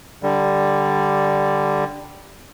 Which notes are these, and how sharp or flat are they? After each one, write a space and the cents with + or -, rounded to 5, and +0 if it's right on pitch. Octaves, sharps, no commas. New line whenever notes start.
D3 +0 G3 +0